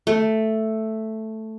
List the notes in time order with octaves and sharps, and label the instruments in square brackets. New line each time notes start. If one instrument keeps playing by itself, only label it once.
[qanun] A3